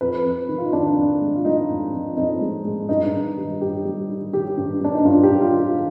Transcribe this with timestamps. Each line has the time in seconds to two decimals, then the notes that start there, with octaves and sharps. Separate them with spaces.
0.01 F2 B4
0.25 F2
0.49 D#3
0.58 F4
0.66 D#4
0.72 F2 D4
0.97 F2
1.21 G#3
1.35 F4
1.45 G#3 D#4
1.69 F2
1.93 F2
2.17 F2 D#4
2.41 G#3
2.64 G#3
2.89 G2 D#4
3.13 D#3
3.37 G3
3.61 G2 G4
3.85 G3
4.09 D#3
4.33 D#3 G4
4.57 G2
4.81 G2 D4
4.95 D#4
5.05 G2 F4
5.23 G4
5.29 G2
5.41 F4
5.53 D#3
5.59 F4